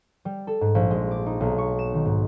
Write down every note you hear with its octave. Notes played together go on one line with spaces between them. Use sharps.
G3
A4
G#2
A#1
G#3
D6
D#4
B1
C#6
E7
D#3
G#2